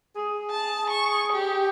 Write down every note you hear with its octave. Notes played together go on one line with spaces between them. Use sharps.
G#4
A5
C#6
G4